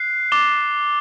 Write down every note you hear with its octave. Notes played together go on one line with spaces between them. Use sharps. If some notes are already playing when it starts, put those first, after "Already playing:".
Already playing: F#6 C7
D6 A6 E7 G7